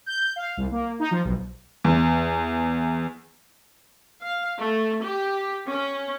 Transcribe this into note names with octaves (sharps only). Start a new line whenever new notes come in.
G6
F5
C2
A#3
D#4
F3
B1
E2
F5
A3
G4
C#4